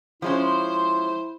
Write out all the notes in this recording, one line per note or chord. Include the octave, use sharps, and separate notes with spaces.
F3 G#3 C#4 E4 C5 C6